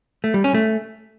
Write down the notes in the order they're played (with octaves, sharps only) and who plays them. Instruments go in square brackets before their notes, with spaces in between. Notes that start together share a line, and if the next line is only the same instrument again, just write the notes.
[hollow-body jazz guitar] A3
G3
C#4
A3